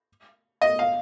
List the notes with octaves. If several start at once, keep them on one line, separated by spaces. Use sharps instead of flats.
D#5
F5